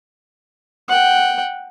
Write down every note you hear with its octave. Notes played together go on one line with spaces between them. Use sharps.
F#5 G5